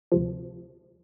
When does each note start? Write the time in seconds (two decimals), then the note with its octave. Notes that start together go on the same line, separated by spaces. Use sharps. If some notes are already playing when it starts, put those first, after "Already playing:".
0.12 D2 C3 F3